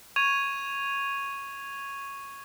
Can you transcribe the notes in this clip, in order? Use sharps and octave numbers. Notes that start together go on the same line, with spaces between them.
C#6 G#6 D#7 F7